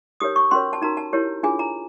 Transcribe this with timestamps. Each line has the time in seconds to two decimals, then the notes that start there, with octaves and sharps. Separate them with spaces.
0.20 D#4 G4 A#4 C#5 D#6
0.36 C#6
0.51 C#4 F#4 A#4 C#5 C6
0.73 A5
0.82 D#4 F#4 A#4 A#5
0.97 A5
1.13 E4 G4 A#4 C#5
1.43 D4 F4 G#4 G#5
1.59 A#5